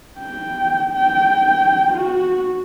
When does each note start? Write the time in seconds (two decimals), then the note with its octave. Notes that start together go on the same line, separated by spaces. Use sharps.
0.19 G5
0.94 G5
1.93 F#4